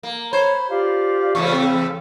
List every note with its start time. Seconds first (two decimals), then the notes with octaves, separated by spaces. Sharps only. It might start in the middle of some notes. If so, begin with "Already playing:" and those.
0.03 A#3
0.33 C5 C#5 B5
0.69 F4 G4 D5 F5
1.35 E2 C#3 A3 C#6
1.52 C4